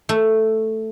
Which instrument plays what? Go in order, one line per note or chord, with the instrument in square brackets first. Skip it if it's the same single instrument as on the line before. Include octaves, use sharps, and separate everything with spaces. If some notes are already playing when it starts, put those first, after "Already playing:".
[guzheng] A3